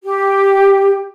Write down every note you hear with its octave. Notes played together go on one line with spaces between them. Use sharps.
G4